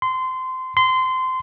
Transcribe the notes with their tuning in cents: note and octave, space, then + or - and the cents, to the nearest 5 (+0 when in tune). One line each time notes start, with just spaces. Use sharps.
C6 -20
C6 -20